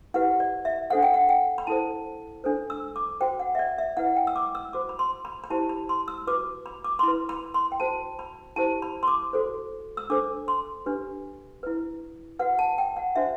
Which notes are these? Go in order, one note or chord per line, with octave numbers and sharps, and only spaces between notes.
E4 G4 B4 F#5
D5
E5
D4 A4 C5 F#5
G5
F#5
G5
B5
E4 A4 C5 A5
D4 A4 C5
E6
D6
F#4 C5 G5
F#5
E5
D5
E5
E4 B4 F#5
G5
E6
D6
E6
F#4 C5 D6
B5
C6
B5
B5
E4 G4 C5 A5
B5
C6
E6
F#4 B4 D6
B5
D6
C6
E4 B4 B5
B5
C6
G5
F#4 C5 A5
B5
E4 G4 C5 A5
B5
C6
D6
F#4 A4 C5
E6
D4 A4 C5 D6
C6
D4 G4 B4
E4 B4
F#4 B4 F#5
A5
G5
F#5
D4 F#4 C5 E5